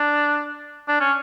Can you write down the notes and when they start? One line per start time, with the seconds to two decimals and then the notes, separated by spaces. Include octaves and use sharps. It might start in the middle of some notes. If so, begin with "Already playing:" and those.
Already playing: D4
0.88 D4
1.00 C#4